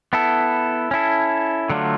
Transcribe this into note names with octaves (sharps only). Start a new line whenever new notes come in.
B3 E4 A4
C#4 E4 A4
D3 F#3 A3 D4 F4